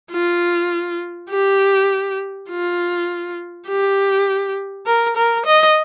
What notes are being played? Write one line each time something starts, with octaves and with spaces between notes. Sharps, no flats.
F4
G4
F4
G4
A#4
A#4
D#5